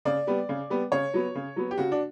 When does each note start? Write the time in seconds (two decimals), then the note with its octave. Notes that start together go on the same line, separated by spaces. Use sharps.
0.05 C#3 D5
0.27 G3 B3
0.49 C#3
0.70 G3 B3
0.92 C#3 C#5
1.14 F#3 B3
1.35 C#3
1.56 F#3 B3
1.71 G4
1.78 C#3 F#4
1.92 D4